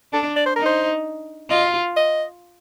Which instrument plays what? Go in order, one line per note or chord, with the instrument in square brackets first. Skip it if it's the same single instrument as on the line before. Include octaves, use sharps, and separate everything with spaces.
[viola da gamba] D4 [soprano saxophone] A4
[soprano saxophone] D5
C5
[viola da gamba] D#4 [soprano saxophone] A#4
[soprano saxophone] C5
[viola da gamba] F4 [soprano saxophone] D#5
[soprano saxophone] D#5